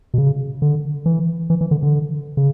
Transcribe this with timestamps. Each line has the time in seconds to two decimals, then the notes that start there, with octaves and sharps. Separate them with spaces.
0.14 B2
0.18 C#3
0.62 D3
1.06 E3
1.50 E3
1.61 E3
1.71 D3
1.83 D3
2.37 C#3